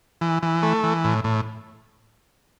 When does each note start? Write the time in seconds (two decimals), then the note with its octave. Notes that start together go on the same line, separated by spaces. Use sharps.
0.21 E3
0.43 E3
0.63 A3
0.84 E3
1.04 A2
1.24 A2